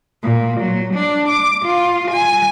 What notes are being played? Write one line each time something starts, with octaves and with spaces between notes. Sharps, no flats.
A#2
F#3
D4
D6
F4
G#5